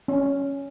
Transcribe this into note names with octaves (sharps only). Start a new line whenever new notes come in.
C#4